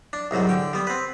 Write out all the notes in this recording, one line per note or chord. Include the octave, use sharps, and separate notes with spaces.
D4
C2 G#2 F#3 G3
D3 G5
G3 B3
C4 B4